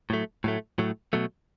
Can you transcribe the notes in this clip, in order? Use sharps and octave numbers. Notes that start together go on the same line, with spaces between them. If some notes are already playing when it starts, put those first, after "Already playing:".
A2 F#3 A3
A2 F#3 A3
A2 F#3 A3
B2 F#3 A3